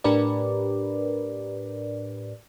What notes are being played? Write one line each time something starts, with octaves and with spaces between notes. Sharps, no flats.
A2 D4 G4 A#4 B4 D5